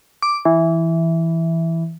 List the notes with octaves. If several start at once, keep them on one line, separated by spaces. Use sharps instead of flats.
D6
E3